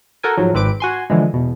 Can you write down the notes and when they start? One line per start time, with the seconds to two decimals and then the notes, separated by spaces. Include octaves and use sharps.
0.23 F#4 A4 A#4 G#5
0.37 G#2 F3 F#3
0.54 G#1 C4 B4 D6 D7
0.80 F#4 G#5 C6
1.10 D3 E3 F3 G#3
1.34 E2 B2